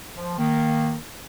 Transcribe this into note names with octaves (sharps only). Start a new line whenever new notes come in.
F3
D#3 A#3